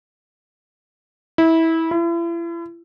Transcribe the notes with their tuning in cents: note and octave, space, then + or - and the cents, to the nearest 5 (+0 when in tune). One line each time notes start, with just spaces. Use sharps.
E4 -20
E4 +40